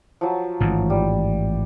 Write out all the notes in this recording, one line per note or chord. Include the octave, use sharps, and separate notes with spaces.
F3 F#3
A1 G#2 D#3
G3